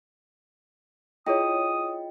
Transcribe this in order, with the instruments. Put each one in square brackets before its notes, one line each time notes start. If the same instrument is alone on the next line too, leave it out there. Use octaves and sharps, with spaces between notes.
[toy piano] E4 G#4 C#5 [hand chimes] F4 D#5 G5 [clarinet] D#6